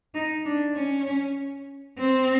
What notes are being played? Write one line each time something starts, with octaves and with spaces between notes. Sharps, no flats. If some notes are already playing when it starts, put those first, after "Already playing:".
D#4
D4
C#4
C4